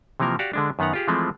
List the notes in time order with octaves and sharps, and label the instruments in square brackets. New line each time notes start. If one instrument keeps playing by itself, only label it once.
[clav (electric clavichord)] C3 E3 F3 A#3 A#4
F#4 G4 D5 F5
D3 G#3 D4
F#2 D#3 B3 F#5 A#5
F4 G4 G#4
E3 F3 G#3 A3 C4